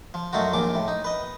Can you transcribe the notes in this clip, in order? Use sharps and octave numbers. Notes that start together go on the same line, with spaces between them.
F3
F#2 F#3 A3 D#4 F4 F#4
A#1 D#2 A#2 F3 D6
A2
D#4
B4 D#5